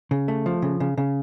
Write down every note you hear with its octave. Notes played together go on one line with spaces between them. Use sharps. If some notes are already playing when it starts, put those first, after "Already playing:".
C#3
A3
F3
C#3
C#3
C#3